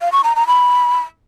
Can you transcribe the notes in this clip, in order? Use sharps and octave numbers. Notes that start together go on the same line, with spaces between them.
F5
C#6
A#5
A#5
B5